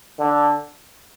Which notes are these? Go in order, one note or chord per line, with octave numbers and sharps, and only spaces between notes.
D3